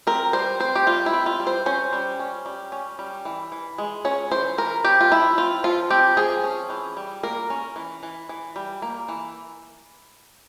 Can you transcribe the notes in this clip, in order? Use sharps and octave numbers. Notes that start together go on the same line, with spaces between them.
C4 A#4
G3 C5
C4 C5
G4
G3 F4
E4
C4
F4
G3
C5
C#4 C5
G3
C#4
G3
C#4
G3
E3
E3
G#3
C#4 C#5
E3 C5
E3 A#4
C4 G4
F4
F3 E4
C4 F4
F3 F4
C4 G4
F3 G#4
C#4
E3
G3
A#3 A#4
C#4
E3
E3
E3
G3
A#3
E3